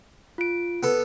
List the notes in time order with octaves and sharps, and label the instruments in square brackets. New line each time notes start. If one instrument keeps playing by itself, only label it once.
[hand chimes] F4 D7
[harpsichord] B3 A4